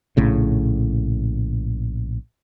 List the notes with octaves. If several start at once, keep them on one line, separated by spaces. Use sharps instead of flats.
A#1 A2 C#3